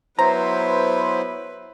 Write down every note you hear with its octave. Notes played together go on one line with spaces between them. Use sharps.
F#3 B3 E4 B4 C5 A#5